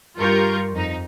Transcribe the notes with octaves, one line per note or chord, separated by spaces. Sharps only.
G2 F4 G4 A#4 C#6 G6
F2 D#4